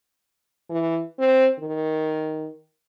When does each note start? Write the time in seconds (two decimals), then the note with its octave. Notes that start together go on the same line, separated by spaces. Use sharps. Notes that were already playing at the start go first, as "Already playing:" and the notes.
0.70 E3
1.19 C4
1.59 D#3